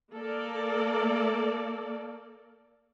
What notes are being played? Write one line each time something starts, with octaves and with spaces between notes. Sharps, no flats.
A#3 A4 A#4 D5